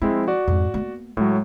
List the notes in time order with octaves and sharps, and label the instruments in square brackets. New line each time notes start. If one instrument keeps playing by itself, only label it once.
[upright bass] F3 [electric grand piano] G#3 C4 E4
[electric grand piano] F#4 D5
[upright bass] F2 G#2
A#3 B3
[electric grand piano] A2 F#3 [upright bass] G#3